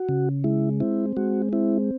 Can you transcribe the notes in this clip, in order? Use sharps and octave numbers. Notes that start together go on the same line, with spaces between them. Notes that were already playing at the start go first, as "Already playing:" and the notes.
Already playing: F#4
C#3
G#3 E4
C4 E4
G#3 F#4
C4 E4